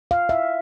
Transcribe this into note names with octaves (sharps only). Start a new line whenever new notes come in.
F5
E5